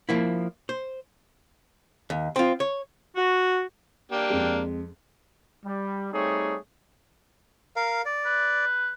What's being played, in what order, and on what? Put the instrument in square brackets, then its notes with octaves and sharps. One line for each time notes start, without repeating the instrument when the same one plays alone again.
[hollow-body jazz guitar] F3 A#3 E4
C5
D#2
C4 F4
C#5
[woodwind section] F#4
[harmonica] A#3 D4 G4
[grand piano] F2 G#3
[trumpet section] G3
G3 A3 C4 D#4 G#4 C#5
[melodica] A#4 F5
D5
[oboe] B4